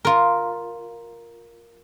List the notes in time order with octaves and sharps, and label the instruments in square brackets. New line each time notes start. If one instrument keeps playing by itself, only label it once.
[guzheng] F4 A#4